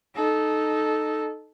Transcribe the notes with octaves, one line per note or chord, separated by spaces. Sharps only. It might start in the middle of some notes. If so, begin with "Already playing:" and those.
D#4 A4